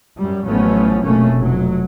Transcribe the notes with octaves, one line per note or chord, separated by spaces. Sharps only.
F#2 G3
A1 F3 F#3 A3 B3 C#4
F1 B2 A3 A#3 C#4
F1 F#3